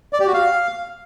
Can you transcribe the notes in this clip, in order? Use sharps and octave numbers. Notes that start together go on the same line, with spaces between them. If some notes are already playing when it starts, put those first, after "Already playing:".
D5
G4
F#4
F5